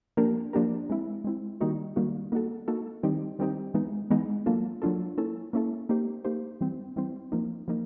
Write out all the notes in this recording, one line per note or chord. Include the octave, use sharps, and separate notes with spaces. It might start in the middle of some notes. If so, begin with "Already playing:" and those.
F3 A#3 D4 G4 A#4
F3 A#3 D4 G4 A#4
G#3 C4 E4
G#3 C4 E4
D#3 G3 A#3 D#4 F#4
D#3 G3 A#3 D#4 F#4
A#3 D#4 F#4 A4
A#3 D#4 F#4 A4
D#3 G3 C4 D#4 G4
D#3 G3 C4 D#4 G4
E3 G#3 B3 D#4
E3 G#3 B3 D#4
F#3 A#3 D4 F4 A4
F#3 A#3 D4 F4 A4
A#3 C#4 E4 A4
A#3 C#4 E4 A4
A#3 D#4 G4 C5
A#3 D#4 G4 C5
E3 G3 C4
E3 G3 C4
F3 A#3 D#4
F3 A#3 D#4